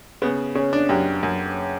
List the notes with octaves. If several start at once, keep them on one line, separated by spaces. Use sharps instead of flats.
C#3 B3
C#3 C#4
D4
F#2 G4
F#2